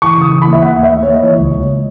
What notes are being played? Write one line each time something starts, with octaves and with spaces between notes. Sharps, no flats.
E3 C#6
C#3 D#6
E3
B5
D#2
E5
D#2 F#5
D#2
E5
D#2
C#5
D#2
D#5
E3 C#5
C#2
C#2